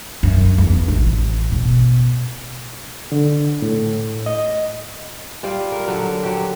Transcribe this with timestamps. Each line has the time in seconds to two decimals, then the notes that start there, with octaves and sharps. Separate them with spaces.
0.23 F#2
0.58 E2
0.88 A1
1.52 B2
3.12 D3
3.62 A2
4.26 D#5
5.43 G3 F4 G5
5.72 A#4
5.88 D3 F#3
6.23 F#3 G4